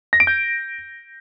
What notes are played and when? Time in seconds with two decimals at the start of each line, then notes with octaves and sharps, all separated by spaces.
0.13 A#6
0.20 D7
0.27 G6